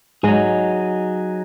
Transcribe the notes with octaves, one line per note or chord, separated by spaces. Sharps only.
G#2 F#3 G#3 D#4 G#4